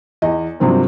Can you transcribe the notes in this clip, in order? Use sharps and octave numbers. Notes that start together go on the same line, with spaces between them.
E2 D#5
G2 C3 F3 F#3 A#3 C4